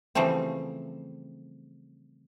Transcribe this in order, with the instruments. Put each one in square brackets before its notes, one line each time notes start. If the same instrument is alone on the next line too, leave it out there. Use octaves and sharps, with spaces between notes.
[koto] C#3 E3 F3 G3 A3 C4